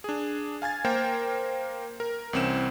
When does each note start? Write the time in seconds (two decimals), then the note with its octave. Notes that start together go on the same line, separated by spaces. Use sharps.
0.04 D4 G#4
0.62 F5 G#5 G#6 A6
0.85 A#3 A#4 C5 G5
2.00 A#4
2.33 C2 E3 C4 C#4 E7